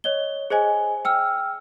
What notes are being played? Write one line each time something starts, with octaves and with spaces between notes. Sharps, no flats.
C#5 D#5 G7
G#4 C5 D#5 G#5
G5 E6 F6